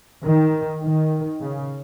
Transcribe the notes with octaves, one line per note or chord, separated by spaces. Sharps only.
D#3
D#3
C#3